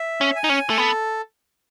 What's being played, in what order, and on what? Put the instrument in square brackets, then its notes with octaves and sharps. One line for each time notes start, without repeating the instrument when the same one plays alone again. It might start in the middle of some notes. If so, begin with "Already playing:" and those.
Already playing: [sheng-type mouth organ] E5
[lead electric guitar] C#4
[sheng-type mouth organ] G#5
[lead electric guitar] D#4
C#4
A3
[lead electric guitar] B3 [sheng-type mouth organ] A4